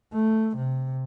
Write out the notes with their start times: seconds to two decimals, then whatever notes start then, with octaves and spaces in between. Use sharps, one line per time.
0.13 A3
0.57 C3